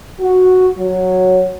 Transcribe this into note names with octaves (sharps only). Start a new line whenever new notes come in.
F#4
F#3